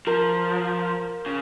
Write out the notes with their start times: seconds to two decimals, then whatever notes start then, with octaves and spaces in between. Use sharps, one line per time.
0.07 F3 A#4
1.26 C#3